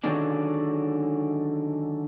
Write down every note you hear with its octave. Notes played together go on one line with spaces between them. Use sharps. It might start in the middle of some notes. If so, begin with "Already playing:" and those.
D3 D#3 F#3 G#3 C#4 D4